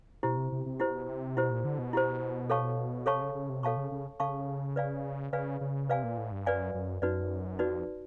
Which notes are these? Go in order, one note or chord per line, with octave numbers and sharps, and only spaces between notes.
B2 E4 G4 C5
C3
C3
C3
B2 E4 G4 C5
C3
B2 E4 G4 C5
A#2
D3
B2
E4 G4 C5
A4 C#5 F5 A5 C#6
C3 A4 C#5 F5 A5 C#6
C#3
C#3
C3
B2 A4 C#5 F5 A5 C#6
C#3
C#3
C#3 A4 C#5 F5 A5 C#6
B4 D5 F5 G#5
C#3 B4 D5 F5 G#5
C#3
C3 B4 D5 F5 G#5
A#2
A2
G2
F#2 B4 D5 F5 G#5
F#2
F#2 D#4 F#4 B4 D5
F2 D#4 F#4 B4 D5